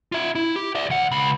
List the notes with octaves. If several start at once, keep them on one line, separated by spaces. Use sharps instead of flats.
F4 E5
E4
G4
D5 E5
D2 F#5
C#2 B5